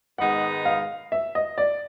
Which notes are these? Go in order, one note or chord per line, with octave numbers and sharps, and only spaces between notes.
G#2 D#3 G#3 B3 D#4 F#5
F5
E5
D#5
D5